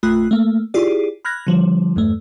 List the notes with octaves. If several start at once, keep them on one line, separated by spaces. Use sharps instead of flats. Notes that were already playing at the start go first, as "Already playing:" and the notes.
A#1 A3 F4 B5 D#6 F#6
A3 A#3
E4 F4 G4 G#4 D5
B5 F6 F#6 G#6 A#6
D3 F3 G3
E2 G2 A3